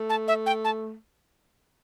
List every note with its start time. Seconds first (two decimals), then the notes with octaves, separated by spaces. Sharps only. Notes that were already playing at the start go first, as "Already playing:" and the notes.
Already playing: A3
0.10 A5
0.28 E5
0.46 G5
0.65 A5